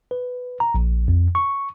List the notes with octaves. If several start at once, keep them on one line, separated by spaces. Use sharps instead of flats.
B4
A#5
A#1
F2
C#6